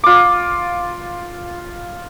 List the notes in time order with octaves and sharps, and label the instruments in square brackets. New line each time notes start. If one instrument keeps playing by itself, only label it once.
[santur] F4 D6